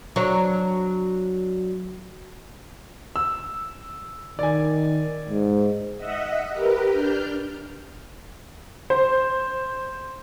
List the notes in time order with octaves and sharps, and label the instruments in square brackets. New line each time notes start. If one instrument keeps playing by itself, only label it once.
[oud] F#3 D4 C#5
[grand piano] E6
[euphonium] D#3 [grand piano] D5 G#5
[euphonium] G#2
[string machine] D#5 E5 F#5
G4 A#4 B4
D4 F6 G6
[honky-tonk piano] C5